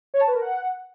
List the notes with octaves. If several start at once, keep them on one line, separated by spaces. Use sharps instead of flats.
C#5
A5
B4
A#4
F#5